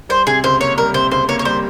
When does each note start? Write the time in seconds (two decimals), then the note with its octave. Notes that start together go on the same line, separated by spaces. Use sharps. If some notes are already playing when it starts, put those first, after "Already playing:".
0.09 G3 C5
0.27 C3 G#4
0.44 C#2 C5
0.60 A#3 C#5
0.78 G3 A#4
0.94 C3 C5
1.11 C#2 C5
1.29 A#3 C#5
1.39 C#5
1.45 G3 C5